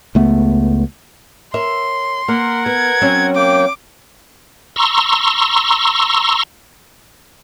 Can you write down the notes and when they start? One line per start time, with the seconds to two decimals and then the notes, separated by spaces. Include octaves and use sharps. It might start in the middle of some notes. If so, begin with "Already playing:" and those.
0.15 C#2 A3 B3
1.54 A#4 C#5 E5 C6
2.28 A#3 A#4 F#5
2.66 B3 G#6
3.01 F#3 C4 C#4
3.36 A#3 G5 D6
4.76 A#5 C6 C#6 E6